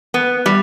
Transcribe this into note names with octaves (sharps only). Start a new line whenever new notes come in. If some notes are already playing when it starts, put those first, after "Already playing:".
B3
G3